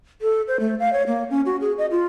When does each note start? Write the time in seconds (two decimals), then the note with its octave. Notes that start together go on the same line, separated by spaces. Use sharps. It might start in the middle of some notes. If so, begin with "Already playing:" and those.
0.21 A4
0.48 C5
0.60 A3
0.80 F5
0.93 C#5
1.07 A#3
1.30 C#4
1.46 F#4
1.61 G#4
1.78 D#5
1.91 F4